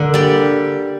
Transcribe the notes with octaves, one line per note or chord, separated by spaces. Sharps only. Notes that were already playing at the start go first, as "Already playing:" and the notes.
Already playing: D3 A#3
G3 D5